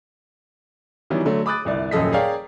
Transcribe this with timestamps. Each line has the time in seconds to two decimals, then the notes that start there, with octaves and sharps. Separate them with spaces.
1.10 D#3 E3 F#3 G3 B3
1.25 D3 F#3 A3
1.46 B5 D6 D#6 F#6 A6
1.65 G1 C2 D5
1.91 D#1 F#2 F3 A4 D#5 B6
2.13 G#4 A#4 C#5 D5 F5 G5